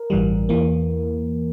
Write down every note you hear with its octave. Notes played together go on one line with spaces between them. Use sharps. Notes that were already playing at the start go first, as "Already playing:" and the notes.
Already playing: A#4
A1 G2 E3 G3
E2 E3 A#3